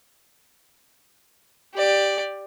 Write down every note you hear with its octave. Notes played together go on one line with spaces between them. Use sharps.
G4 D5